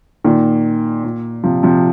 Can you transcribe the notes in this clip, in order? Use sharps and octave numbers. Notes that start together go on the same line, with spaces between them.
A#2 D#3
A#2
C3 F3
C3 F3